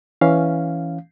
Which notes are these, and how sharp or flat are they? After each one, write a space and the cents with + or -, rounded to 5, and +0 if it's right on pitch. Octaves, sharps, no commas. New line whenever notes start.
E3 +0 C#4 +0 F5 +0